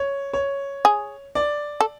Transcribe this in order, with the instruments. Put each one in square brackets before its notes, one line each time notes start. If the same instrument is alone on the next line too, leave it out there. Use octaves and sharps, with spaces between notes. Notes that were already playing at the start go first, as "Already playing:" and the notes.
Already playing: [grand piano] C#5
C#5
[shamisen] G#4
[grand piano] D5
[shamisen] A4